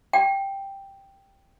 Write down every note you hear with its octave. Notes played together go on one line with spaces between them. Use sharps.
G5